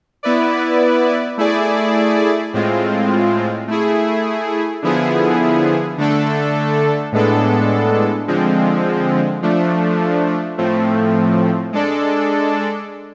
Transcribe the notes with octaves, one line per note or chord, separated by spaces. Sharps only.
B3 E4 B4 D5
A3 E4 G#4 D5
A2 G#3 C4 F4
A3 E4 G#4
D3 F3 B3 E4 G#4
D3 A3 D4 A4
A2 G#3 B3 D4 A4
D3 F3 G#3 C4
F3 A3 D4
A2 F3 A3 C4
G#3 D4 A4 D5